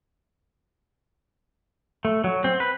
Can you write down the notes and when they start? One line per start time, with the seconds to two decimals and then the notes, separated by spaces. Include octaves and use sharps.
2.05 A3
2.24 F#3
2.44 C4
2.60 B4